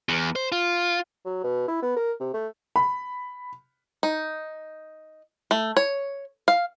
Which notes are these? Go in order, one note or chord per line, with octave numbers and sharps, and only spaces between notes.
E2
C5
F4
F#3
B2
E4
B3
A#4
C3
A3
B5
D#4
A3
C#5
F5